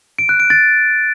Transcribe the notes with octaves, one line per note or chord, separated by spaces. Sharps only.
D7
F#6
D7
A6